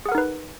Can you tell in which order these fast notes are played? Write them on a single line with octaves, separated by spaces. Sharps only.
G#4 F#5 A#4 D#4 B4